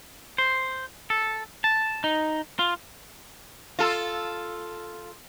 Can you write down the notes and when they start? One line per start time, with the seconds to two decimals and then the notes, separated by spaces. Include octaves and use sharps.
0.38 C5
1.10 A4
1.64 A5
2.04 D#4
2.59 F4
3.79 F4 A4